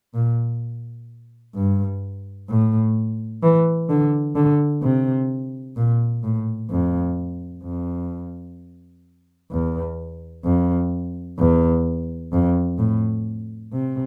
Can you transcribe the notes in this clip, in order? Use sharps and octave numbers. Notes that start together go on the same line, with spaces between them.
A#2
G2
A2
E3
D3
D3
C3
A#2
A2
F2
F2
E2
F2
E2
F2
A2
C3